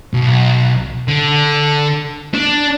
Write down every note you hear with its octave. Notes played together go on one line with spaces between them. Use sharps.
B1
D3
D4